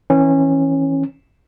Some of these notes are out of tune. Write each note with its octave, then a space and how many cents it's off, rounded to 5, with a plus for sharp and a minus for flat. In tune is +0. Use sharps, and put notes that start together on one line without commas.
E3 -20 C#4 -20